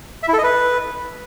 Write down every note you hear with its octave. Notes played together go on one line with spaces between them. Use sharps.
E5
E4
A4
D#5
B4